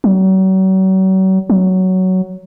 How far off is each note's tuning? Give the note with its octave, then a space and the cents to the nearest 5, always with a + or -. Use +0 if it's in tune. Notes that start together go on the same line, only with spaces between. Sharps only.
F#3 +40
F#3 +10